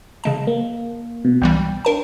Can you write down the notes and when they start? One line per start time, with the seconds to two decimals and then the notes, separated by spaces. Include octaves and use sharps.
0.24 C#3 G#3 A5
0.47 A#3
1.25 B2
1.42 C2 E3 G3 G5
1.85 D4 A#4 A5